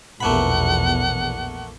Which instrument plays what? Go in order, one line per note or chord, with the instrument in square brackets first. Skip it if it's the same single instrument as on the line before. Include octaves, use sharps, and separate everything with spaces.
[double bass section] A#1 E2 B2 [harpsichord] A3 A#3 B5 [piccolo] F#5